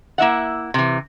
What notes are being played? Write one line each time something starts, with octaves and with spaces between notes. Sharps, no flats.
A#3 E4 E5 F#5
C3 E3